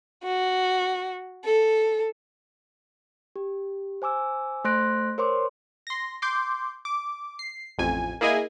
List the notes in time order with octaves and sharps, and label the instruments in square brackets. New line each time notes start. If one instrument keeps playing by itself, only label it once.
[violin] F#4
A4
[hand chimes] G4
C5 G#5 D6 E6
A3 C5 C6 F#6 A#6 D7
A#4 C5 C#5 C6 D6
[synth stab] C6 A#6
C6 D6 G6
D6
C7
A1 F2 G#5
A#3 E4 G#4 D#5 G#5